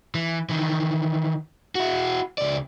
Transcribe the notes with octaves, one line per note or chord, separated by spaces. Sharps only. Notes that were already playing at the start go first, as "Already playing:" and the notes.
E3
D#3 E3
E4 F#4
C#2 D5